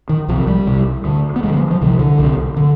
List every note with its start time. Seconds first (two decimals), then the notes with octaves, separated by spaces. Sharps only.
0.09 D#3
0.28 C2 C3 F3
0.47 G3
0.67 C2 C3
1.04 D2 D3
1.36 B3
1.43 D2 G#3
1.47 D3
1.53 F3
1.71 F3
1.81 C2 C3 D#3
1.99 D3
2.19 C2 C3
2.57 D3